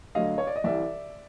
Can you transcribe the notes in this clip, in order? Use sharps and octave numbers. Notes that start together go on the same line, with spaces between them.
D2 D3 F#3 D#5 F5
C#5
D5
D#5
C2 C3 E3 D5 E5